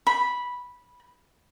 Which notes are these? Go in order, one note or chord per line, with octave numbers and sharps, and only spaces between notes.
B5